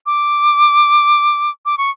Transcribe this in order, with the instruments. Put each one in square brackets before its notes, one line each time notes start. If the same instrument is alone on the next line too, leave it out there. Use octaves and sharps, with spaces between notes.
[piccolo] D6
D6
C#6